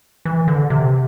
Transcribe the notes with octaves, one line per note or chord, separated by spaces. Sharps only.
E3
D3
C3